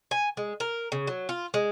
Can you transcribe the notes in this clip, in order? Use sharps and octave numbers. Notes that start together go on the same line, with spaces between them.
G#5
G#3
A#4
C#3
F#3
F4
G#3